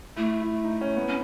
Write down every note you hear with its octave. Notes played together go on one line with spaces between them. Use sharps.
A3 E4
E4
D#4
C#4
B3
C#4